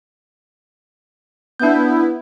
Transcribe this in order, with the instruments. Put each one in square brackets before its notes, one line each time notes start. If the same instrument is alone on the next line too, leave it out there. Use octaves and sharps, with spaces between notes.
[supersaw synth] B3 E4 [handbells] D4 G6